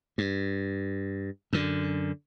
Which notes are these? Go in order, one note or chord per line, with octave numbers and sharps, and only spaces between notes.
G2
F#2 D3